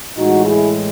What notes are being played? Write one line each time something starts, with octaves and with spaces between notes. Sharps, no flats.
A2 E3 G#3 D#4 F#4
E4 G#4